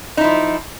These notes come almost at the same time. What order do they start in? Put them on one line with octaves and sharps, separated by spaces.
D#4 E4 F3